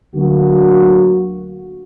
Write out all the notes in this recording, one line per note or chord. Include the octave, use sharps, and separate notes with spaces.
D2 D3 F#3 A#3 F#4